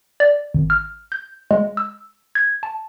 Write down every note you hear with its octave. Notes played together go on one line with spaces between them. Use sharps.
D5
G#1
F6
G6
G#3
E6
G#6
A5